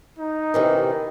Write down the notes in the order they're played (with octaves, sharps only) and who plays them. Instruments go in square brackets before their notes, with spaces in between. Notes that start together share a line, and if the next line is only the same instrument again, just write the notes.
[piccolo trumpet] D#4
[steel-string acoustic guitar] C3 D#3 E3